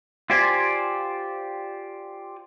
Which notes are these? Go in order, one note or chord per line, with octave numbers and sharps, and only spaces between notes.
F4 G4 C5 D5 G#5